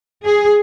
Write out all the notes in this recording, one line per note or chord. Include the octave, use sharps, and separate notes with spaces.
G#4